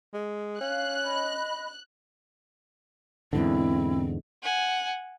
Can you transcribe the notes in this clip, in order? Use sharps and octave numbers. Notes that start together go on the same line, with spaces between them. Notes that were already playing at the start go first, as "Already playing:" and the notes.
G#3
C#4 F5 F#6
D#5 B5
E2 G#2 D3 C4 E4
F#5 G#5